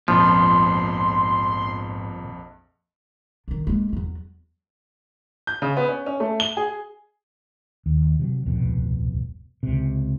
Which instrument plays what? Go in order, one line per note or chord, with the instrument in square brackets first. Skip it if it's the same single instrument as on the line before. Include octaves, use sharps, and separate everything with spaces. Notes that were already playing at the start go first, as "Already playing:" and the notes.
[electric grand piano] A#1 F2 [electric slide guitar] G#2 G3 B3 [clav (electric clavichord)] F3 [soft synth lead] C6
[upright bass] D3 D#3
G#3 A#3
E2 F#3
[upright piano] G6
C#3
B3
C#4
C#4
A3
G7
G#4
[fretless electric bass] D#2
C3 F3 F#3
D1 C2 F2 B2
C#2 C3